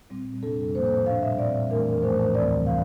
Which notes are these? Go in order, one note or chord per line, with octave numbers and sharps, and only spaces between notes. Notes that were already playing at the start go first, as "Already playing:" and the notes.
A#2 G3 C4
F2 C3 G3 D4 A4
A2 F3 A#3 C5
A#2 G3 D4 F5
E5
A#2 G3 C4 D5
F2 E3 A3 D4 A#4
A2 F3 A3 D4 C5
D2 C3 E3 G3 C4 D5
E3 F5